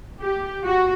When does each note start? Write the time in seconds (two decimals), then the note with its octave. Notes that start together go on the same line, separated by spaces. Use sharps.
0.21 G4
0.65 F#4